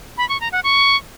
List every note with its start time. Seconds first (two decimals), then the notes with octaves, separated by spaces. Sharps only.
0.18 B5
0.29 C#6
0.41 A#5
0.52 F#5
0.64 C#6